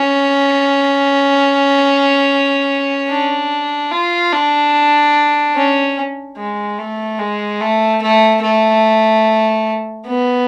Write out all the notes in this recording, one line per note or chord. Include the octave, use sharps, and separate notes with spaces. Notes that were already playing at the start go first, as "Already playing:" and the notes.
Already playing: C#4
D4
F4
D4
C#4
G#3
A3
G#3
A3
A3
A3
B3